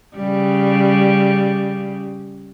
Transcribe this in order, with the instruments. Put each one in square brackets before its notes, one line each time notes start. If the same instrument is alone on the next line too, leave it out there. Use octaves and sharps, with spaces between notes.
[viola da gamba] C#3 G3